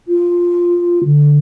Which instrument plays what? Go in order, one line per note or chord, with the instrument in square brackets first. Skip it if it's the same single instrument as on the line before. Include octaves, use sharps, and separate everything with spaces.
[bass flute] F4
D3